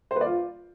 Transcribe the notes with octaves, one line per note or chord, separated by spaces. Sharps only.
C5
B4
D5
F4